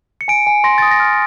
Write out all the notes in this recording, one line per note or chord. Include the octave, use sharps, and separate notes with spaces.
C#7
G#5 D7
G#5
C6 A#6
D#6 A6
A#6
F6